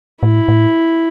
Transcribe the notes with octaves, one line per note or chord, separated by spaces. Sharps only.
A2 E4
A2